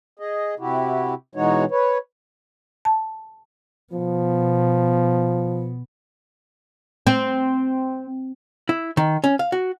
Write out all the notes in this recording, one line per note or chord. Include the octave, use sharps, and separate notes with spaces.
G#4 D#5
C3 E4 F#4 G4
B2 E3 G#3 D#4 F#4 C#5
B4 C#5
A5
B2 F3 B3
C4
E4
D#3
C#4
F5
F#4